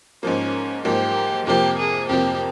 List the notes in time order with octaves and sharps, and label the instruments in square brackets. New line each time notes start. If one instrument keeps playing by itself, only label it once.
[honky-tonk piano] G#2 F3 A#3 [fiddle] C#4
[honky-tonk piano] G#2 F3 A#3 [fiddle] G4
[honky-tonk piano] F2 C3 F3 A#3 [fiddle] G4
[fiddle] G#4
[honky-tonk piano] F2 C3 F3 A#3 [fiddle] G4